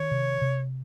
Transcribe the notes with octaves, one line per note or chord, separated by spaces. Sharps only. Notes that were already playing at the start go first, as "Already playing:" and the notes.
Already playing: D#3 C#5
C3
C3